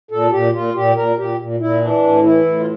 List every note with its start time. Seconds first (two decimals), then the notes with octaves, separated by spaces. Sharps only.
0.11 A#2 A4
0.31 A#2 G4
0.53 A#2 F4
0.74 A#2 G4
0.96 A#2 A#4
1.17 A#2 G4
1.38 A#2
1.60 A#2 E4
1.81 E3 D4
2.03 A2
2.23 E3 E4
2.45 A2
2.60 F4